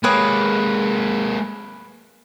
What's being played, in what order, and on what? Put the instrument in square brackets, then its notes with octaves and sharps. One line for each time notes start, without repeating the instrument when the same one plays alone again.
[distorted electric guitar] G#3 A#3 [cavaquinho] B4 C#5 D#6